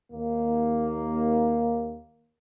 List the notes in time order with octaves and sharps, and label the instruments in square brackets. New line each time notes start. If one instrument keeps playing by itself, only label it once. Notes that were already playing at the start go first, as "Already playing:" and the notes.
[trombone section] D#2 A#3